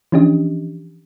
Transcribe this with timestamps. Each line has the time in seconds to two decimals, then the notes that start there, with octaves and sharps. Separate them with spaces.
0.12 E3 F3 C#4 D4 G4 D#5